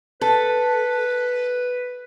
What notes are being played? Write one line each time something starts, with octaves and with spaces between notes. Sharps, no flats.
A4 B4